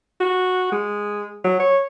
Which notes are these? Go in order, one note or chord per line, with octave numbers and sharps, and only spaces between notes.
F#4
G#3
F#3
C#5